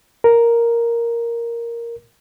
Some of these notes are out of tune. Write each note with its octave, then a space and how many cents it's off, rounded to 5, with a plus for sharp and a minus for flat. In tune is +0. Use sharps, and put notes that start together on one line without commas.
A#4 +0